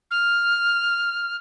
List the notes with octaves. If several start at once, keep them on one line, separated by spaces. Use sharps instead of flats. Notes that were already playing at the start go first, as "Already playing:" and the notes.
F6